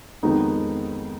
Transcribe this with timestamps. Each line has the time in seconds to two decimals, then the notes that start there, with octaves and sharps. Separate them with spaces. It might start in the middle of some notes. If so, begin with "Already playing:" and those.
0.23 F2 D#3 G#3 B3 D#4